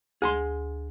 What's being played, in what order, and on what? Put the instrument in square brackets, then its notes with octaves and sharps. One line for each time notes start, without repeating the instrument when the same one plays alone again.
[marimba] D2 [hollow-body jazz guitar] G#4 A#5 C6